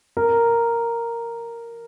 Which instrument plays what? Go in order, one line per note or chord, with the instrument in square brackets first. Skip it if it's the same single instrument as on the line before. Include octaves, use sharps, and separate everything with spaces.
[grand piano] A#4